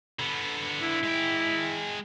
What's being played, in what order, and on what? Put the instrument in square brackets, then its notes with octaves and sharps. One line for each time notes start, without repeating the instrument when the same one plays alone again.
[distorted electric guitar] D3 B3
[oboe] E4
[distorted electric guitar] G#3 G5